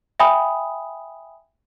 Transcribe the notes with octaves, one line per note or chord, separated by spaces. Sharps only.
E5 G5 G#5 B5 D#6